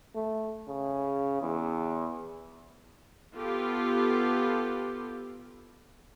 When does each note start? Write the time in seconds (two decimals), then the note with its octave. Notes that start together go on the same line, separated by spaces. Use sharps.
0.15 A3
0.68 C#3
1.41 E2
3.34 B3 F4 G4 A4